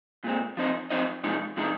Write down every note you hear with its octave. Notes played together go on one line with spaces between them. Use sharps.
A#2 G#3 C4
F3 C4 D#4 C5 D#5
F3 C4 D#4 C5 D#5
C3 F3 G#3 D#4
C3 F3 G#3 D#4